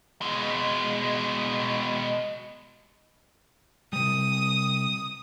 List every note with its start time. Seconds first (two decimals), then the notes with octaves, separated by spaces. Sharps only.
0.21 B2 G#3
3.93 C3 G3 D#6